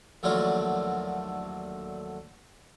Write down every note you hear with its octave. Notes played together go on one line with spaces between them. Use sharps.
A#1 D#2 D3 F#3 A3 F4